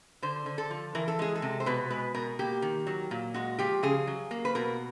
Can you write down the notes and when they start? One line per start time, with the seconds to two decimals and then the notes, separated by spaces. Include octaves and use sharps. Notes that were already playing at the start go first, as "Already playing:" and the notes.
0.22 D3 C5
0.46 D3
0.58 A4
0.70 F3
0.95 E3 A#4
1.08 A4
1.19 G#3 G#4
1.35 A4
1.42 C3
1.60 C5
1.66 B2 B4
1.90 G#3 B4
2.14 B2 A#4
2.39 A#3 G4
2.62 D#3
2.87 F#3
3.11 A#2
3.34 G#3 F#4
3.59 F3 G4
3.83 C#3 G#4
4.07 F#3
4.31 A#3
4.45 B4
4.55 B2 A#4